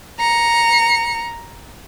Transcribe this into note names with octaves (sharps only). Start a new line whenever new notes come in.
A#5 C#7